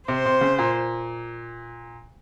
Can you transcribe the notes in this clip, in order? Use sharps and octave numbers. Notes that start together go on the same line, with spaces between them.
C3 C5
C3
C#3
A#2